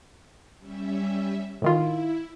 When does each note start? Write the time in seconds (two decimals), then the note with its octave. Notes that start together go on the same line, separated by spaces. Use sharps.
0.59 G3 C#4 E5
1.62 A2 D#3 E4 F4